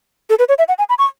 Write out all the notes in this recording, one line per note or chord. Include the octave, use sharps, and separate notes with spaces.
A4
B4
C#5
E5
F#5
G#5
B5
C#6